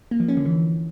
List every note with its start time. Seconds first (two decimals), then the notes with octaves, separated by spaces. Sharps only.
0.11 A#3
0.20 F3
0.28 C#4
0.37 D3
0.46 E3